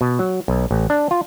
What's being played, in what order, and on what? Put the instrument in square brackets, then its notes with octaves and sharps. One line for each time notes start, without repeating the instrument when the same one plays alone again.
[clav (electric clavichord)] B2
F#3
B1
A1
D4
F4